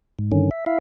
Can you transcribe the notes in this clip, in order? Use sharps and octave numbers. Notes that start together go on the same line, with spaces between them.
G#2
G2 D3 D#3 C#4
E5
E4 E5 F5